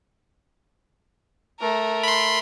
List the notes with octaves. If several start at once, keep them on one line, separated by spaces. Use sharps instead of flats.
A3 A#4
B5 C6